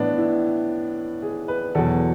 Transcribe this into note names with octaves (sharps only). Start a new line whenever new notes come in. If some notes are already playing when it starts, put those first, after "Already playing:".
Already playing: A2 E3 B3 D4
E4
G#4
B4
E2 B2 F#3 A4